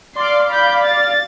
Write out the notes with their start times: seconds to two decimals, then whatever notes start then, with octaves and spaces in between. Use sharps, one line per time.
0.15 D5 F5 C6 D6
0.51 B5 G6
0.84 A6